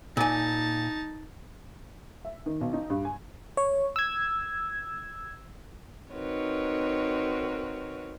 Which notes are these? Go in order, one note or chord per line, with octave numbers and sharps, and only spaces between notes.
A#2 D#4 G#5 A5
E5
D#3
B1
D#4
G2
G#5
C#5
E6 G#6
C4 D#4 F#4 A#4 B4 C#5